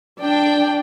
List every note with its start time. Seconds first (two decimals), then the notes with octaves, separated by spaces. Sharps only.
0.21 D4 D5 G5